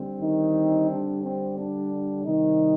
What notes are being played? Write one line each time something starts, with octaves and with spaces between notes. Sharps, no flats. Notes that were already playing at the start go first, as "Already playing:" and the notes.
Already playing: D3 G3 C4
D#3 D#4
D4
C4
D4
C3 D#3 G3 C4 D#4